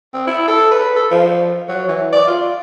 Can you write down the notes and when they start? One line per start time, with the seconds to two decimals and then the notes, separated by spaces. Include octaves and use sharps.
0.14 C4
0.27 E4
0.48 A4
0.71 B4
0.96 A4
1.11 F3
1.69 F#3
1.89 E3
2.12 D5
2.27 F4